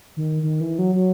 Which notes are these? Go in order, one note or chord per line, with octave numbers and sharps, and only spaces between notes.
D#3
D#3
E3
F#3
F#3